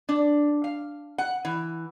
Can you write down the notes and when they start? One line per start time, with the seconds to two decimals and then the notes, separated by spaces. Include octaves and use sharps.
0.09 D4
0.64 F5
1.18 F#5
1.45 E3